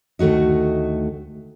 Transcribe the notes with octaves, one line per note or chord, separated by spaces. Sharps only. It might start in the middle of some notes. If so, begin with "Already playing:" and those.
D2 D#3 A3 F#4 D#5